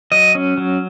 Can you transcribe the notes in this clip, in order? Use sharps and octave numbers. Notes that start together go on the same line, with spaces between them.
F#3 D#5
C#4
F#3